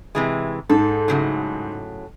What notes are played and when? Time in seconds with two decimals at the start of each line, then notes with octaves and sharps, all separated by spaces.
0.15 C3 E3 G#3
0.69 G#2 A4
1.08 A2 C#3 F#3